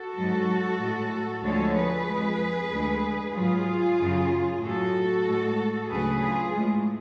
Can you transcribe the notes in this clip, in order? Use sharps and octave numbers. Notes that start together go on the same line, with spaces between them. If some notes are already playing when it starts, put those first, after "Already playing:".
Already playing: F#4 A4
G#2 F#3
A2 G#3
D2 D3 F3 G#3 A4 C#5
G#4 B4
F2 F3 G#3
D2 D3 G#3
G#2 F#3 F4 G#4
F#2 C#3 F#3
A2 F#3 F#4 A4
A2 G#3
D2 C#3 F#3 G#4 B4
F4 G#4
A2 G#3